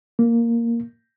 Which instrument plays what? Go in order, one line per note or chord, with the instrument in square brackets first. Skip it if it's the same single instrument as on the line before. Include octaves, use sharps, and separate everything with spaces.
[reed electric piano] A#3